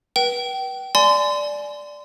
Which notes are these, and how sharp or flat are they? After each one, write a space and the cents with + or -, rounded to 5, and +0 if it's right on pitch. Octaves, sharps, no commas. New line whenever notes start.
B4 -30 G5 -30
D5 +0 G#5 +25 C6 -30